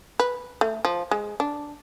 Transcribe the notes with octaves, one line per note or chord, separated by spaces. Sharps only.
B4
A3
F3
G#3
D4